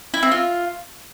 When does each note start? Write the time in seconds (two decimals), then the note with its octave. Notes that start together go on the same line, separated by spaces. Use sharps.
0.14 E4
0.23 C4
0.32 F4